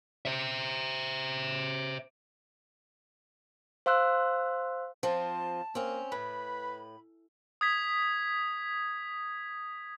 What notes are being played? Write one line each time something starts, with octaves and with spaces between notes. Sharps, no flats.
C5 E5
C5 F5 C6 E6 F#6
F3 C4 F4 A5
A#3 C4 C#4
A2 B4 B5
D#6 G#6 B6